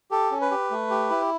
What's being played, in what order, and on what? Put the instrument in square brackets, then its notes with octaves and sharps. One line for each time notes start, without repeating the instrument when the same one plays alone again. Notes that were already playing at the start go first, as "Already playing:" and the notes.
[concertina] G4 A4
C#4
B4
G4
A3
G4
E4